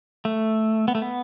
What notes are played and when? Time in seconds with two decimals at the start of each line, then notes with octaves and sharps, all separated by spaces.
0.25 A3
0.88 B3
0.95 A3
1.02 B3